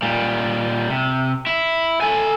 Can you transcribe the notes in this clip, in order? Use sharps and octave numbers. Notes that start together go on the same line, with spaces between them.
A#2 G3
C3
E4
A4 G#5